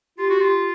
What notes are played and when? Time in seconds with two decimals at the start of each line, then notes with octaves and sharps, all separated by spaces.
0.18 F4 G4
0.30 F#4
0.40 F4